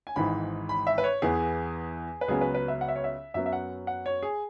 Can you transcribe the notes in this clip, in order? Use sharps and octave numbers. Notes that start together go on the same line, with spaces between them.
G#5
G#1 G#2 E3 B5
B5
E5
B4
C#5
E2 E3 B3 G#4
B4
C#2 C#3 F#3 B3 G#4
B4
B4
E5
F#5
E5
C#5
E5
F#2 F#3 B3 E5
E5
F#5
F#5
C#5
G#4